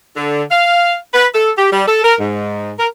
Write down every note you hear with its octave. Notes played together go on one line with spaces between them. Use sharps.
D3
F5
B4
A4
G4
G3
A4
A#4
G#2
A#4